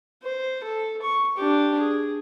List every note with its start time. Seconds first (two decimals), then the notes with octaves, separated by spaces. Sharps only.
0.23 C5
0.63 A4
1.02 C#6
1.37 D4 G4
1.79 G#4